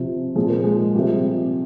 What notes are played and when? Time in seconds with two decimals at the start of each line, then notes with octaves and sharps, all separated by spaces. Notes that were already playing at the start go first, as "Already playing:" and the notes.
Already playing: C3 F3
0.36 A#2 F3 G#4
0.49 A#4
0.64 G#3 G#4
0.94 C3 F3 G3 G4